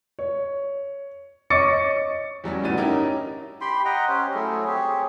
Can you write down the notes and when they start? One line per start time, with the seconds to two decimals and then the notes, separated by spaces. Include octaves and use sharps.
0.19 C#5
1.50 C#5 D#5 C#6 D6 A6 C#7
2.44 E2 F#3 G3 C#4
2.63 G1 A2 F#4 A6 D#7
2.77 C#4 D#4 E4 G4 A#4
3.61 G4 G5 B5 C6
3.85 D#5 F#5 G5 A#5
4.08 C#4 G4 C5 C#5
4.34 F#3 A3 E4 G#4
4.67 C4 G4 G#4 C#5